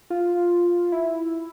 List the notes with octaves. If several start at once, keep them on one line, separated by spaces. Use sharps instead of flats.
F4
E4